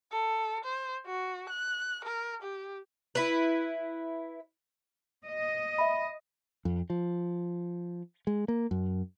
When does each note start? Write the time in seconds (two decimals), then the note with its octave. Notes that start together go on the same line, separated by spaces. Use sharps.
0.12 A4
0.64 C5
1.06 F#4
1.49 F#6
2.05 A#4
2.42 G4
3.15 E4 B4
5.26 D#5
5.78 E5 B5
6.65 F2
6.90 F3
8.27 G#3
8.48 A#3
8.71 F#2